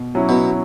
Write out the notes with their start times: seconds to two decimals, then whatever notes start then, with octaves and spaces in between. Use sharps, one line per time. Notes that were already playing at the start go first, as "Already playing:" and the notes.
Already playing: B2
0.15 F#3 C#4 E4
0.29 B2